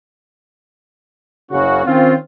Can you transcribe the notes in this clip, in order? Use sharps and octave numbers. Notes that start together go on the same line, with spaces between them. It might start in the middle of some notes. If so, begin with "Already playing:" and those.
F#1 C#3 C#4 F#4
D#3 C4 C#4 F4